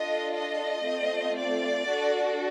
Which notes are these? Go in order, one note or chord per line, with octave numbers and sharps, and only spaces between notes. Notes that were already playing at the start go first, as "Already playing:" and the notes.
Already playing: D4 F4 A4 D#5
D#5
A3 C4 F4
D5
D4 F#4 A4